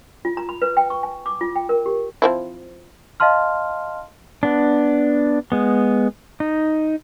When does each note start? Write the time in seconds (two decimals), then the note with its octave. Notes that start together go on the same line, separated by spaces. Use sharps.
0.25 F4
0.37 A#5
0.49 B5
0.62 B4
0.77 G5
0.90 C#6
1.03 G#5
1.26 D6
1.41 F4
1.56 G5
1.69 A#4
1.86 G4
2.22 F3 C4 E4
3.20 D#5 F5 A5 C6 F6
4.43 B3 D4
5.52 G#3 B3
6.40 D#4